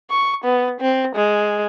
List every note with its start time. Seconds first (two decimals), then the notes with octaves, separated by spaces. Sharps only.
0.10 C#6
0.44 B3
0.80 C4
1.15 G#3